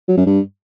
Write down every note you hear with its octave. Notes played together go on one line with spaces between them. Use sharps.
F#3
F#2
G2